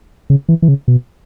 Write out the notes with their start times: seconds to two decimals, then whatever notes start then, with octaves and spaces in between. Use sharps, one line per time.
0.30 C#3
0.49 E3
0.62 E3
0.68 C#3
0.88 B2